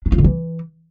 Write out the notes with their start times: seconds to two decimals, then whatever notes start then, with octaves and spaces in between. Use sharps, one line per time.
0.06 D4
0.12 F4
0.18 D3
0.24 E3